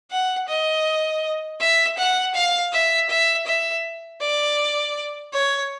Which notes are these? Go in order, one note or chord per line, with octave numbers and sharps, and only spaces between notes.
F#5
D#5
E5
F#5
F5
E5
E5
E5
D5
C#5